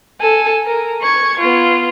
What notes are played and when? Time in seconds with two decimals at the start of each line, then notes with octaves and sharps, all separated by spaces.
0.21 A4 G#5
0.66 A#4
1.02 C#6 G#6
1.40 B3 F4